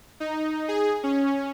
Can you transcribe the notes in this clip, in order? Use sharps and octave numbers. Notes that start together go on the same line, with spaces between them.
D#4
G#4
C#4